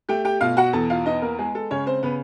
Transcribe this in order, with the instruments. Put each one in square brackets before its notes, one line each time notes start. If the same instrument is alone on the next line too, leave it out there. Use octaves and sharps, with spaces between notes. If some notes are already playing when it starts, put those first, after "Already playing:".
[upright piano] A3 G4 G5
G4 G5
B2 F4 F5
F#4 F#5
E2 A4 A5
F4 F5
B3 D#4 D#5
A#3 A#4
G#3 G#4
A4
C#3 C#4 C#5
C4 C5
C#3 B3 B4